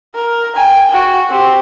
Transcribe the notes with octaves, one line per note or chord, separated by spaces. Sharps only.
A#4
G5 G#5
F#4 G5
C4 G4